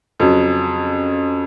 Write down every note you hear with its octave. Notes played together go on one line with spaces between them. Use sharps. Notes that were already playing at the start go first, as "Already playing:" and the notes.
F2 C#3 F#3